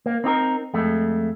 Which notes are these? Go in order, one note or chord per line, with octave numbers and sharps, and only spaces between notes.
A#3
C4 D#4 G4 A#4
F2 G#3 A3